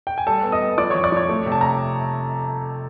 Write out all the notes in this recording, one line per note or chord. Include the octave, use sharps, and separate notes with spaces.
G5
G#5
G3 A4 A5
B3
D#5 D#6
G3
F3 D5 D6
C#5 C#6
F2
D5 D6
F3 C#5 C#6
A3
C3
A5
A#5